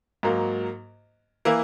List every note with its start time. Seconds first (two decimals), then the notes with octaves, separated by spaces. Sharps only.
0.23 G#2 F#3 A#3
1.45 E3 A#3 E4